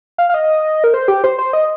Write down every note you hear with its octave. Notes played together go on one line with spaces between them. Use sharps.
F5
F5
D#5
A#4
C5
G4
C5
C5
D#5